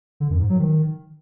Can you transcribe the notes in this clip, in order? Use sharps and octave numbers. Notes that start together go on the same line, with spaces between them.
D3
F#2
G#2
F#3
D#3